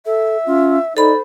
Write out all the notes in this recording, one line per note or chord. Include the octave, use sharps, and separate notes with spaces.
A4 E5
C#4 F4
D#4 A4 C5 D5 B5